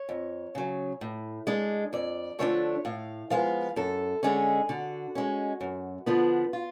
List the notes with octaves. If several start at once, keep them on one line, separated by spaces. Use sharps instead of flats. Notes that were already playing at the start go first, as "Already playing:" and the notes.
Already playing: C#5
F2
C#3 F#3
A2
G#3 D4
F2 D5
D3 F3 A3 D4 C#5
A2 F5
F3 G#3 B3 F5
F#2 A4
D3 G#3 C#4 G#4
D3 F#4
G#3 C#4
F#2
D3 F3 B3 D4
F4